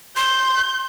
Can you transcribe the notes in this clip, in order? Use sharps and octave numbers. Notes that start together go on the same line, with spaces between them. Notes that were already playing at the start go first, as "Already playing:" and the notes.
C6 G6